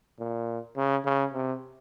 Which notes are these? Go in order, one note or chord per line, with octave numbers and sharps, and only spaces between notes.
A#2
C#3
C#3
C3